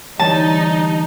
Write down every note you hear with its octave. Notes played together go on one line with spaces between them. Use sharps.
D2 E3 G3 D#4 C#5 A5